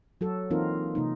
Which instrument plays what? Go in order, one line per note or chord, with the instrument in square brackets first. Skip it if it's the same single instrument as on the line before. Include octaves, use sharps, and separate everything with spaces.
[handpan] F#3 F#4 A4
E3 A#3 C4 D#4 F4 A#4
C3 A#3 D#4